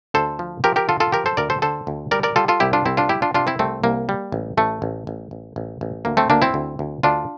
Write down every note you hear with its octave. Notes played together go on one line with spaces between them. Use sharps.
D2 A4 C5
F3
F3 G4 A#4
G4 A#4
D3 F4 A4
F4 A4
F3 G4 A#4
A4 C5
D2 A#4 D5
A4 C5
D3 A4 C5
D2
G3 A#4 D5
A#4 D5
G3 F4 A4
F4 A4
C2 E4 G4
D4 F4
C2 C4 E4
D4 F4
G3 E4 G4
D4 F4
C3 D4 F4
C4 E4
C2 A3 C4
C2 A#3
G3
A1
A1 A3
A1
A1
A1
A1
A1
D2 A#3
A3 C4
D2 A#3 D4
C4 E4
D2
D2
D2 D4 F4